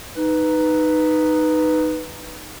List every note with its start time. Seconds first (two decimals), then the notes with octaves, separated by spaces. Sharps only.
0.16 D#4 B4